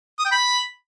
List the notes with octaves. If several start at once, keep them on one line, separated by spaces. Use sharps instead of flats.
D#6
G5
B5